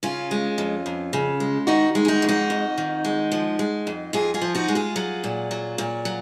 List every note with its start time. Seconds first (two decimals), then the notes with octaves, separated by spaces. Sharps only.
0.03 C#3 C#4 F4
0.31 G#3
0.58 F2
0.86 F2
1.13 C#3
1.40 G#3
1.67 D#3 D#4 F#4
1.95 G#3
2.05 G#4
2.08 D#4 F#4
2.22 F2
2.29 D#4 F#4
2.50 F2
2.78 D#3
3.05 G#3
3.32 F3
3.59 G#3
3.87 F2
4.13 F2 F4 G#4
4.34 F4 G#4
4.41 F3
4.55 D#4 F#4
4.68 G#3
4.75 F4 G#4
4.96 F#3
5.24 A#2
5.51 F#3
5.78 A#2
6.05 F#3